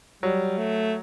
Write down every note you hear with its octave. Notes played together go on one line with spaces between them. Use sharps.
F#3 G3
A3